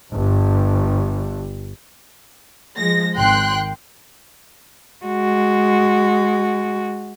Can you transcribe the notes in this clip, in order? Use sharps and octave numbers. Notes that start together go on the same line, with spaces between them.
G1 G2
F3 G#3 A#6
G#1 G5 C6 F#6
G#3 F#4